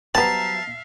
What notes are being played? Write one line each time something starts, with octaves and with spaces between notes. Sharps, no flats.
F#3 G3 B3 C5 E5 F5 A5 A#5